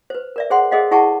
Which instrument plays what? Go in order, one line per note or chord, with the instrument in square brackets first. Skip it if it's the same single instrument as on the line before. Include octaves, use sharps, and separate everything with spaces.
[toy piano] B4 C5
A#4 D5 E5
G#4 C5 F#5 C6
G#4 A4 C5 D#5 F5 F#5
E4 G#4 F#5 A5 C#6